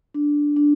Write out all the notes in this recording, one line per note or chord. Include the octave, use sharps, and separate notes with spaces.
D4
D4